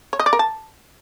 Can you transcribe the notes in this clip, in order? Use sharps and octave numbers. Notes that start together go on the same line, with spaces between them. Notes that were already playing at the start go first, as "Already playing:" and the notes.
C#5
D#5
D5
A#4
A5